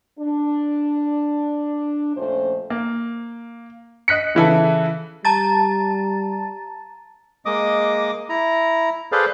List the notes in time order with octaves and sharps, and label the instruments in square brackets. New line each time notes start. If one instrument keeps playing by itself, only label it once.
[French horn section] D4
F2 A#2 A3 C#4 C5
[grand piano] A#3
D#5 F#6 B6 C#7
C#3 E3 E4 A4
[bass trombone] G3 [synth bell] A5 A#5 A6
[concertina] G#3 A#3 D#5 D6 D#6
E4 A#5
G#4 A4 B4 C5 D5 F5